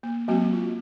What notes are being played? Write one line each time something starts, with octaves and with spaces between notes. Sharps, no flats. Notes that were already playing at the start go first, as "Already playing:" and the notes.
A#3
F#3 G#3 A#3 C4 F#4
F4